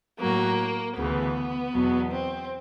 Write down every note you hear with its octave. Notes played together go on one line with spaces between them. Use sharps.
A2 F#3 A#3
D2 C#3 E3 B3
E2 B2 F#3
C4